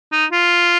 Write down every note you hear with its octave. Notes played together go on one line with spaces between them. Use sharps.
D#4
F4